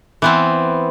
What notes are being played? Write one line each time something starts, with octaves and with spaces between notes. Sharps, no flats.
E3 B3 C4